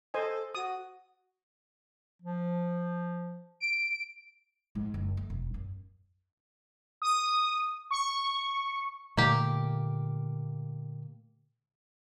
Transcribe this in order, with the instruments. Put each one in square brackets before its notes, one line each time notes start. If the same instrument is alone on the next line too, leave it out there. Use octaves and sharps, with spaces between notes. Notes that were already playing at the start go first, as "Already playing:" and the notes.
[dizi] A4 [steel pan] C5 D#5 G#5
[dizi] F#4 [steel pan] D#6
[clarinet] F3
[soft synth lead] D7
[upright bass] G#2
F#1
A3
E1
F#2
[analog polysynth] D#6
C#6
[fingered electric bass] A#2 D3 A3 [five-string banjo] A#3 G4